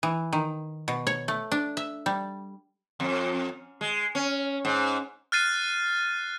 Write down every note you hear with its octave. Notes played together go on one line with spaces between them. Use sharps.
E3
D#3
B2
C#5
A3
D4
E5
G3
F2
G#3
C#4
G#2
F6 F#6 A6 C7 D#7